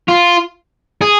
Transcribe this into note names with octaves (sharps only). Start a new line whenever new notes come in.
F4
G#4